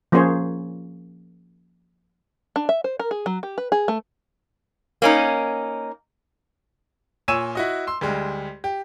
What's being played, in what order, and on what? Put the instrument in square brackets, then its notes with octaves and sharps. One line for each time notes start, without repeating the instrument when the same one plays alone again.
[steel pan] F3 A#3 C#4 G#4 C5 C#5
[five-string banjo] D4
E5
C5
A#4
G#4
F#3
G4
B4
G#4
A3
[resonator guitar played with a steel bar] A#3 C#4 D#4
[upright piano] A#2 C#5 G#5 E6 D#7 E7
E4 F#4 D#5
C6 E6
D2 G3 G#3
G4